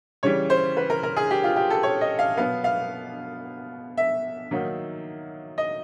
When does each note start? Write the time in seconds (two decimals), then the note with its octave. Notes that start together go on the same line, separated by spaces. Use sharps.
0.23 C#3 E3 G3 C#5
0.50 C5
0.77 B4
0.90 A#4
1.03 A#4
1.17 G#4
1.31 G4
1.44 F4
1.56 G4
1.70 A4
1.83 C#5
2.01 D#5
2.19 F5
2.37 B2 F#3 B3 F5
2.64 F5
3.97 E5
4.51 D#3 F#3 A#3 D#4
5.58 D#5